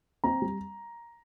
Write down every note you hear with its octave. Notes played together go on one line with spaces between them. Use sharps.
C4 A#5
G3